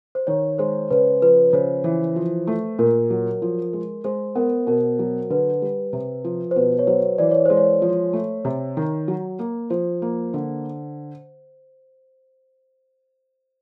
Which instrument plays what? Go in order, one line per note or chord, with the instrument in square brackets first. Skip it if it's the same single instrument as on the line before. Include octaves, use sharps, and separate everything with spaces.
[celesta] C5
[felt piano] D#3 [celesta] C#5
[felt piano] G#3 [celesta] C5
[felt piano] C#3 [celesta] B4
[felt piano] F3 [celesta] B4
[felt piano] C#3 [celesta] C5
[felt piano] E3
F3
A3
[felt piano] A#2 [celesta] A#4
[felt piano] F#3
F3
G#3
[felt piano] G#3 [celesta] C5
[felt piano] B3 [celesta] A#4
[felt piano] B2 [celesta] A#4
[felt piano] F#3
[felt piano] D3 [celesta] B4
[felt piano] G3
C3
F3
[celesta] C5
[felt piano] B2 [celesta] B4
[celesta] C#5
[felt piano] F#3 [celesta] C5
[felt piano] E3 [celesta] D5
[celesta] C#5
[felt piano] G#3 [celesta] C5
[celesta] C#5
[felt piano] F3
A3
C3
D#3
F#3
A#3
[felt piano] F3 [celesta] C5
[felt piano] A#3
D3